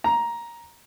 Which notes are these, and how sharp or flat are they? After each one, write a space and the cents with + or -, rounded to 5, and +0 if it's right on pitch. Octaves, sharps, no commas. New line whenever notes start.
A#5 +10